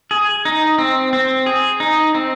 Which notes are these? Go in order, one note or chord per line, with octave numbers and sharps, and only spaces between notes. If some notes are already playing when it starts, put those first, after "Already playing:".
G#4
D#4
C4
C4
G#4
D#4
C4